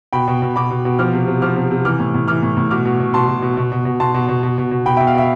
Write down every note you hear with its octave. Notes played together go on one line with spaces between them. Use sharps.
B2 G5 B5
B2
B2
B2 B5 D6
B2
B2
F3 D6 F6
C3
C3
F3 D6 F6
C3
C3
E3 D6 F6
A2
A2
E3 D6 F6
A2
A2
B2 D6 F6
B2
B2
B2 A5 C6
B2
B2
B2
B2
B2
B2 A5 C6
B2
B2
B2
B2
B2
B2 G5 B5
E5 G5
B2
F5
B2 E5